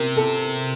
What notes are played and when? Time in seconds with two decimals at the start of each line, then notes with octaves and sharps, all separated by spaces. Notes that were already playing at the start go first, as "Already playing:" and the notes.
Already playing: C3 A#4
0.17 A4